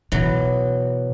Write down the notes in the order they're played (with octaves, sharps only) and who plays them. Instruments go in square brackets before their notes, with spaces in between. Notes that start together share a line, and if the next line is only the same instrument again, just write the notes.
[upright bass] B2 [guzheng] E3 F#3